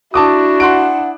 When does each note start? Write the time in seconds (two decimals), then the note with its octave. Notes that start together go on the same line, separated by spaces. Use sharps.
0.14 D4 E4 F#4 A5 D6 D#6
0.60 F#5 C6 F#6 D7